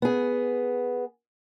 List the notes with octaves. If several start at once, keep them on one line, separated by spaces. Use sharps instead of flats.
B3 G#4